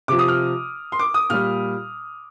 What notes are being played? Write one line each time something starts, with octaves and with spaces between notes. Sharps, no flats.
C3 F3 D6
D#6
F6
C6
D6
D#6
A#2 G3 F6